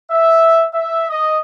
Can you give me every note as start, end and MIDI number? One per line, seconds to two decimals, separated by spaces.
0.11 0.66 76
0.74 1.07 76
1.09 1.40 75